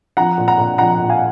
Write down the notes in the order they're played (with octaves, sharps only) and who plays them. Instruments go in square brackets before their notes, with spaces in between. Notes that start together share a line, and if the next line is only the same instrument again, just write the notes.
[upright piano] F3 F#5 A#5
A#2
F#5 A#5
A#2
F3 F#5 A#5
A#2
F5 G#5